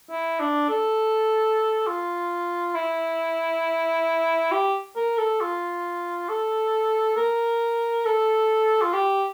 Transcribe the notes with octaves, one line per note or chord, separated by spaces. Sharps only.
E4
D4
A4
F4
E4
G4
A#4
A4
F4
A4
A#4
A4
F4
G4